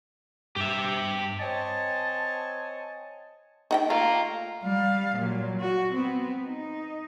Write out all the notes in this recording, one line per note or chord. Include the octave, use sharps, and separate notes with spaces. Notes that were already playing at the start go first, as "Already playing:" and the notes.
G2 G4 E5
C4 C#5 D#5 G#5 A5
D#4 F#5 G5
A3 F4 A#5
G3 F5
A#2 F#3
F#4
B3 C4
D#4